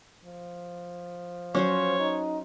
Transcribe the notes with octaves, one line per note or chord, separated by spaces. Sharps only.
F3
F#3 C#4 F#4 C5 C#5
D#4